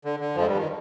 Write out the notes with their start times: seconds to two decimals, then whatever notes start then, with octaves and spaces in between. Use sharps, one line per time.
0.05 D3
0.20 D3
0.36 F2 F3
0.42 G#3
0.46 G2 G3
0.57 D#3